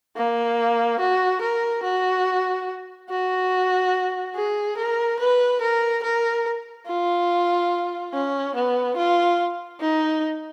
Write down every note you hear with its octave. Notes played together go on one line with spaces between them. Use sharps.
A#3
F#4
A#4
F#4
F#4
G#4
A#4
B4
A#4
A#4
F4
C#4
B3
F4
D#4